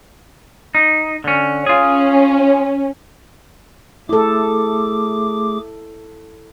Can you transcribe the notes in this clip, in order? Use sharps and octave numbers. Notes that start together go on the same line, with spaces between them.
D#4
D3 C#4
C#4 F4 G#4
A3 E4 G#4 A4 D6